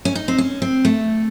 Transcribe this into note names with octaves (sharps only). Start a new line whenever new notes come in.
C#4
D#4
C4
C#4
C4
A3